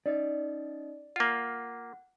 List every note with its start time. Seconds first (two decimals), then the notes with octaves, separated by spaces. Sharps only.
0.06 C#4 D#4 D5 D#5
1.16 A#3 F4 F#5